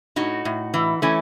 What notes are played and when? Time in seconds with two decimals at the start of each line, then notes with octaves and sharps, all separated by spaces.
0.16 A2 D#4 F#4
0.45 A2
0.74 E3
1.02 E3 A3 C#4